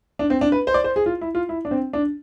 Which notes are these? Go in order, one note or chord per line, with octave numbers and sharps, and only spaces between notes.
D4
C4
D4
B4
C5
D5
C5
G#4
F4
E4
F4
E4
D4
C4
D4